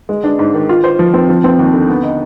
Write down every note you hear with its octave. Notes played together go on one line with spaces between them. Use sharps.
G#3
D4
G#2
D#3
F4
C5
F3
C4
F3
C4
D#2
D3
B3
D#4